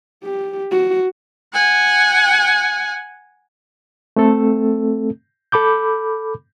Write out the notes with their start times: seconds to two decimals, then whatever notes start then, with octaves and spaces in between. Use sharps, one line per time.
0.24 G4
0.72 F#4
1.53 F#5 G#5
4.16 A3 C4 A4
5.52 A4 B5 D6 G6